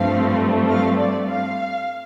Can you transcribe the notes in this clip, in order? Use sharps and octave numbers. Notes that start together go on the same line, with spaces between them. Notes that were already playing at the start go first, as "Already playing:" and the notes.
Already playing: G2 F3 A3 C4 F5
F5
D5
F5